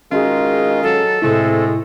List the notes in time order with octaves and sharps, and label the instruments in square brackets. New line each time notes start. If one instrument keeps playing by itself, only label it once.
[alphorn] D#3 [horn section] G#3 D#4 F4 [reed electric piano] C#4 F#4 G#4
[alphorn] F#3 [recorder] A4
[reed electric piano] A2 C3 E4 [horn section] G#3 A3 [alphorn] C4